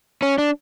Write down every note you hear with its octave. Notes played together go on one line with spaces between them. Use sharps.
C#4
D4